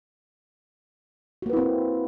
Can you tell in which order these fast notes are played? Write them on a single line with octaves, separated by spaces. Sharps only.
F#4 A#3 B4 E4 C4